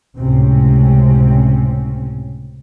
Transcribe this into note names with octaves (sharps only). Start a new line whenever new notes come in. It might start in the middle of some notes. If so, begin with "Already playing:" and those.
C#2 A2 C3 C4 C#4